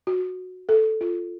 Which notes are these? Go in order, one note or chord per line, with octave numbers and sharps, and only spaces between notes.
F#4
A4
F4